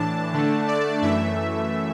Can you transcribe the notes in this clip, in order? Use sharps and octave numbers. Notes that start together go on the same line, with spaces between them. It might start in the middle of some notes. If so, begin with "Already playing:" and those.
Already playing: A2 E3 D4 A5
D3 A3 D4
D5
F#2 E3 A3 E5